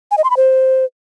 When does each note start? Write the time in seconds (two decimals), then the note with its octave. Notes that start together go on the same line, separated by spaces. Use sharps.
0.11 G#5
0.18 D#5
0.24 C6
0.30 B5
0.37 C5